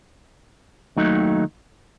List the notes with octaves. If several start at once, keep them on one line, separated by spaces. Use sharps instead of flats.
D#2 D#3 F#3 A3 D#4